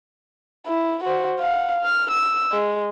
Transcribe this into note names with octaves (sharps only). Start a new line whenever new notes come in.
E4
F#4 C5
F5 F#5
F6
E6
G#3